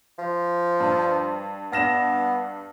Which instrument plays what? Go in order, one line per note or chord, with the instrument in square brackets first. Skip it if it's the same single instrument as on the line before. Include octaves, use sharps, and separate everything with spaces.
[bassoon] F3
[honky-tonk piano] G2
[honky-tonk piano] G2 A#6 E7 [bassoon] B3